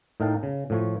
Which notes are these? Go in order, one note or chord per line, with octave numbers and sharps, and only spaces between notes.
A2 D#4 A#4 F5 G5 A5
C#3
A2 F3 C#5